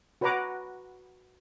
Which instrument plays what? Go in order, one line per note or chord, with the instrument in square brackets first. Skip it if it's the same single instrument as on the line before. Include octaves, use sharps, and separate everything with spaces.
[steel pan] F#4 B4 C#5 F#5 A#5 D6